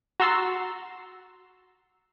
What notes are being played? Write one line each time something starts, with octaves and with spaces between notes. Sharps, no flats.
F#4 A#5 C6 E6 A6 C7